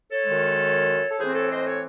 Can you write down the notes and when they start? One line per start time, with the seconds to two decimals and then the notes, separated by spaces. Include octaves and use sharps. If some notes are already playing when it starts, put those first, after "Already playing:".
0.10 A4 C#5
0.25 F#2 D#3 G#3
1.09 A4
1.19 A2 E3 C4 G#4 C5
1.35 A4 C#5
1.51 C5 D#5
1.66 A4 C#5